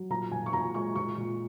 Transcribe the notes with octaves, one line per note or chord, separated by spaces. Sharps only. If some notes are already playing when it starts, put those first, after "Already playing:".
Already playing: F#3
A#2 A#5
A#2 G#5
C#6
A#2 A#5
G#3 C#6
A#2 C#6
A#2